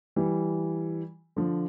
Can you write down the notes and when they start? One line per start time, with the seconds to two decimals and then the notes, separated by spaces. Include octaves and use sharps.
0.16 E3 G3
1.36 D3 F3